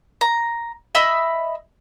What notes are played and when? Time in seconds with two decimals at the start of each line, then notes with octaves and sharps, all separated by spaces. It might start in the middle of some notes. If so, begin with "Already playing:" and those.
0.21 A#5
0.95 D#5 E5 B5 E6